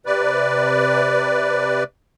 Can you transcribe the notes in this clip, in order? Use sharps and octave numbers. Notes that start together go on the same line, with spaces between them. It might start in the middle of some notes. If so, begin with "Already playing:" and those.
C3 B4 D5